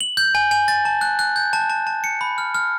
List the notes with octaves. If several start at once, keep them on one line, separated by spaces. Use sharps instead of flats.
F#7
G6
G#5
G#5
A6
A5
F#6
F#6
G6
A5
A5
A5
C#7
B5
F6
F6